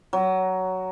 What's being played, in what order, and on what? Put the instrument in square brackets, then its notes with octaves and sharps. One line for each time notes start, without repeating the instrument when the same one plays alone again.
[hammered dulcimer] F#3